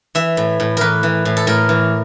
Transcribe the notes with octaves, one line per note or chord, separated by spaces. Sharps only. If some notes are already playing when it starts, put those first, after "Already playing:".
E3 E5
A2
A2
E3 A#4 B4
E3
A2
A4
A2 A#4
E3